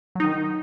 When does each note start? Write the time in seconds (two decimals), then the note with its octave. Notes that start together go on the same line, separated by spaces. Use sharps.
0.15 F#3
0.20 D#4
0.24 D#3